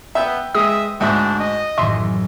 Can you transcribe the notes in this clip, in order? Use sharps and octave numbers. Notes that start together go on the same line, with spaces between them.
B3 B4 E5 G5
G#3 C5 E5 D#6
D2 G#2 D4 E5
D#5
A1 F#2 D#3 E5 C6